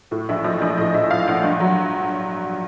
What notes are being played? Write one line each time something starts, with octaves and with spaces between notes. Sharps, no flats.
A2
A#1 E5
F3 D#5
A#1 D#5
A2 D#5
A#1 E5
F3 F5
A#1 F#5
G2 F#5
F#3